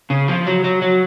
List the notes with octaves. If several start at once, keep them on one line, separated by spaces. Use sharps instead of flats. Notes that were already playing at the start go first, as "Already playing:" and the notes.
C#3
F3
F#3
F#3
F#3